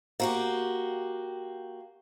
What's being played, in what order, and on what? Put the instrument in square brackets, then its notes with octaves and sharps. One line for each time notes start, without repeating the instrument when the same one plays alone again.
[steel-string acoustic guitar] A#3 F#4 G4